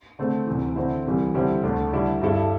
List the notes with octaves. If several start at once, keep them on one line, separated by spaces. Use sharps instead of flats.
D3 A3 C4 A4
D2 C3 E3
D3 C4 E4
C2 C3 E3 G3
D3 G3 C4 E4 G4
D2 D3 A3 D4
D3 G3 E4
G2 G3 E4 A4